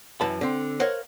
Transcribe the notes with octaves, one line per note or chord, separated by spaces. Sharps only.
F#2 E3 D#5 A5 B5
D3 C4
A#4 C5 C#5 D#5 F5 F#5